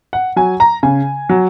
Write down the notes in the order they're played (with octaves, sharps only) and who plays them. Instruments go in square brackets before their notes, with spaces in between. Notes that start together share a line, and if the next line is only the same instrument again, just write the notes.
[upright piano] F#5
F#3 G#5
A#5
C#3 G#5
F#3